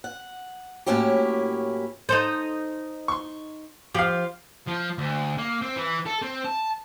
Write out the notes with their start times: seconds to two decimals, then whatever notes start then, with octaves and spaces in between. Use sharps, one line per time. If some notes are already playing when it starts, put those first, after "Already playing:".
0.04 F#5
0.86 A2 F#3 A#3 C#4 E4 G4
2.09 D#4 A4 C5
3.08 C6 C#6
3.94 F3 G4 F5
4.67 F3
4.98 D2
5.38 A#3
5.62 C4
5.76 E3
6.06 A4
6.22 C4
6.44 A5